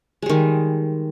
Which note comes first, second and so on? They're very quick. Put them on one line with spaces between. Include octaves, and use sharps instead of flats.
G#3 G3 D#3